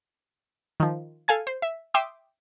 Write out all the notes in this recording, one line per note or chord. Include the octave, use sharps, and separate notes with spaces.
D#3 F3
A4 F5 G#5 G#6
C5
E5
E5 G5 C6 D6 D#6